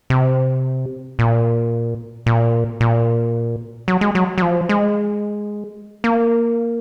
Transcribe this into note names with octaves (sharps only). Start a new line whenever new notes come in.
C3
A#2
A#2
A#2
F#3
G#3
F#3
F#3
F3
G#3
A#3